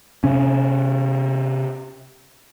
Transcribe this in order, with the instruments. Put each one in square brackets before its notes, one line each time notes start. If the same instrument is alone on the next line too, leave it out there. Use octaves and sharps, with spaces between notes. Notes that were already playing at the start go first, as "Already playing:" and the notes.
[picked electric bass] C3 C#4